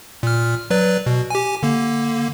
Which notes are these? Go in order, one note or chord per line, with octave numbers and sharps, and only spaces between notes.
A#2 F6
F#3 B4 D5
B2
G4 G#5
D3 A#3